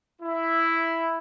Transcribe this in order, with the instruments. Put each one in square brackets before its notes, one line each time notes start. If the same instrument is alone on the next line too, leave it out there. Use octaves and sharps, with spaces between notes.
[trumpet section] E4